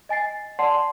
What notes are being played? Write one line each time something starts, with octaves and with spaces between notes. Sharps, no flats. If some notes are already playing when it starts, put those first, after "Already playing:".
D#5 G#5 A6 C7
D5 F#5 A5 C6 C7